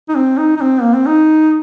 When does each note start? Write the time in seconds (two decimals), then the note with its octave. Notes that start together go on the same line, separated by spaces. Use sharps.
0.09 D#4
0.15 C4
0.38 D#4
0.56 D#4
0.61 C4
0.82 A#3
0.94 C4
1.07 D#4